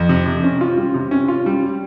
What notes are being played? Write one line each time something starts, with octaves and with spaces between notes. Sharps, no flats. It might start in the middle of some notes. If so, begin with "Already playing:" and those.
Already playing: F2
C3
C3
C#4
F4
G3
C3
C#4
F4
G3